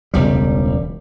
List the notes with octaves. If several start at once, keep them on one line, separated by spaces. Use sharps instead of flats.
E1 C#2 G3